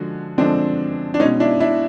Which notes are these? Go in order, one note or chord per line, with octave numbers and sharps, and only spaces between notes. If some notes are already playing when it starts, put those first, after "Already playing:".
Already playing: D3 F3 G#3 F#4
D3 F3 G#3 C4 D4
D4
B2 G#3 C#4 D#4
D4 E4
D4 E4